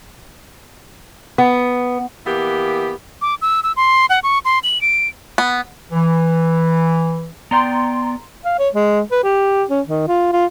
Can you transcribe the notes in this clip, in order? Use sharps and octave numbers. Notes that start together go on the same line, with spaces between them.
B3
E3 A#3 B3 G4
D6
E6
E6
C6
F#5
C#6
C6
F#7
D7
B3
E3
B3 D5 G5 A#5 C6
F5
C#5
G#3
B4
G4
C#4
D#3
F4
F4